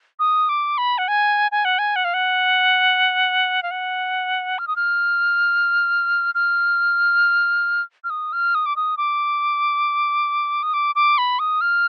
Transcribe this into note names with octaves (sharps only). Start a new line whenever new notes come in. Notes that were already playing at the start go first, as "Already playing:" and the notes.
D#6
D6
B5
F#5
G#5
G#5
F#5
G#5
F#5
F5
F#5
F5
F#5
F6
D#6
F6
F6
F6
D#6
F6
D#6
D6
D#6
D6
D#6
D6
D6
B5
D#6
F6